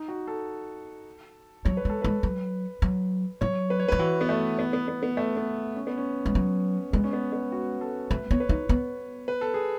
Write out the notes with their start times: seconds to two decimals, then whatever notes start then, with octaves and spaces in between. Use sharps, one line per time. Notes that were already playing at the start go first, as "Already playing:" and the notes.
Already playing: D#4
0.08 F#4
0.28 A4
1.65 F#3 C#5
1.77 B4
1.85 G#3 A4
2.02 G#3 B4
2.23 F#3
2.82 F#3
3.41 F#3 C#5
3.70 B4
3.80 C#5
3.88 F#3 B4
3.99 E3 F#4
4.21 B3
4.29 A3
4.59 B3
4.73 B3
4.88 B3
5.03 B3
5.17 A3
5.37 B3
5.76 C#4
5.87 B3
5.98 C#4
6.26 G#3
6.35 F#3
6.93 G#3 B3
7.04 C#4
7.13 B3
7.33 B3
7.52 F#4
7.81 A4
8.11 A3 B4
8.31 B3 C#5
8.40 B4
8.49 D#4
8.69 B3
9.28 B4
9.41 A4
9.54 G#4